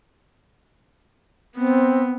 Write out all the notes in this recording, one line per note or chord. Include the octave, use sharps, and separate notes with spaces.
B3 C4